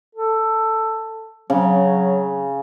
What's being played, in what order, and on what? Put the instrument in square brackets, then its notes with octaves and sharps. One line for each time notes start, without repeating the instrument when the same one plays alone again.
[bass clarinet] A4
[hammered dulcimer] C#3 [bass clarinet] F#3